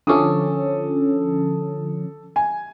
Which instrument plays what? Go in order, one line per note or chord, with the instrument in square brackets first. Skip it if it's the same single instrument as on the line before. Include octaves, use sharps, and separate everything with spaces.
[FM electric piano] D3 F3 C#4 [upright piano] A4 D6 D#6
[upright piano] G#5